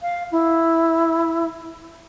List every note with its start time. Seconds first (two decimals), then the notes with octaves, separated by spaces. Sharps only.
0.02 F5
0.32 E4